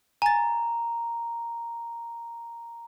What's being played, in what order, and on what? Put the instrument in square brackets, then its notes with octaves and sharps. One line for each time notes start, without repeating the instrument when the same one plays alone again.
[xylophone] G#5 A6 [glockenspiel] A#5